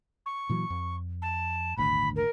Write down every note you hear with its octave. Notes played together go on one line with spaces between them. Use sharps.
C#6
A#2 E3 F#3
F2
A5
D#1 G#1 D2 B5
A#4